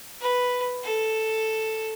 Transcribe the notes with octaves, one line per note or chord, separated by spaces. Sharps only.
B4
A4